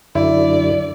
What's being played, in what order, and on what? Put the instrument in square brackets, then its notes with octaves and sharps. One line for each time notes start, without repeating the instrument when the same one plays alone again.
[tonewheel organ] F#2 D3 [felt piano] E4 [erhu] D5